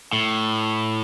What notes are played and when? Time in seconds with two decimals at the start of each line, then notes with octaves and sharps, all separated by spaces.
0.13 A2